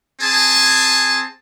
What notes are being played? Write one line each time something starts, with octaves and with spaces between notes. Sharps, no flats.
C4 G#4 G#5 A5